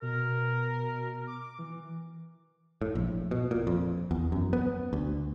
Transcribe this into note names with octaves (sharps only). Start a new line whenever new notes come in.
B2 A#4
D6
E3
A2
A#1
B2
A#2
F2
E2
F#2
B3
D2